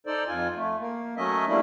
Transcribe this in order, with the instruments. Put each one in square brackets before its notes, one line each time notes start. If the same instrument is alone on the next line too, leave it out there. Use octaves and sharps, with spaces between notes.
[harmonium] D#4 A4 C5 D5
F2 F4 G#5
A3
A#3
F#3 A3 C#4 D#5 E5
G3 A3 A#3 D4 E4